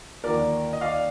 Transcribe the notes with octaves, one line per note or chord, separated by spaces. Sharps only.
D#2 D3 F3 A#3 A#4 D5
D#5
D5 F5